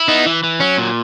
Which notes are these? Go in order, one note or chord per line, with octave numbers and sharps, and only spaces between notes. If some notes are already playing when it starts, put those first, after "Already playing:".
Already playing: E4
B3 D#4
E3
E3
F#3 C#4
A#2